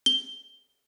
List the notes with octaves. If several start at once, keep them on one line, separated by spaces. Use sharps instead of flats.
G7